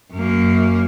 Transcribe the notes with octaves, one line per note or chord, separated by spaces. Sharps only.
F#2 A#3